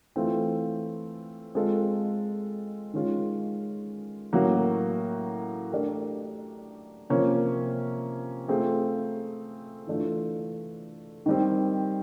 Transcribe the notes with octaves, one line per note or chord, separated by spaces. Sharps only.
E3 A3 C4 F4
G#3 C4 F4 A4
D#3 G#3 C#4 F4
A2 F#3 A#3 C#4 F#4
A3 D4 G4 A#4
C3 F3 A#3 C#4
A3 C4 F4 G#4
E3 A3 D4 F4
D#3 G3 C4